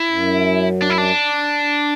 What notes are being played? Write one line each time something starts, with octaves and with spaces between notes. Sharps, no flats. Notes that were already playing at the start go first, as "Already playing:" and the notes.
Already playing: E4
F#2
D4
E4
D4